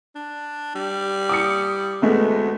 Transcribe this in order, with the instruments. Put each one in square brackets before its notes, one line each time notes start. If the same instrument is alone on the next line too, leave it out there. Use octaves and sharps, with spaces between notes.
[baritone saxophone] D4
G3
[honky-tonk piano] D6 D#6 C#7
[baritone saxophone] D2 [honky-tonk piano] G#3 A3 B3